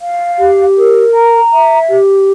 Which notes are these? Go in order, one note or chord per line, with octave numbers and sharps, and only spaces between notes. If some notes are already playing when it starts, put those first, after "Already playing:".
F5
G4
A#4
A#5
E5
G4